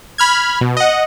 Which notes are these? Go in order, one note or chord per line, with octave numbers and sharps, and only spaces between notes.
B5 F6 G#6
B2
D#5 F#5